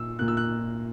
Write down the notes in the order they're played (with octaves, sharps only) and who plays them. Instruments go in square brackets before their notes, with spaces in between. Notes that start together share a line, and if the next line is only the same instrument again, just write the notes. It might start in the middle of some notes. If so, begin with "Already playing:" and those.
Already playing: [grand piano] A#2 E6
A#2 A#3 F#6
E6
F#6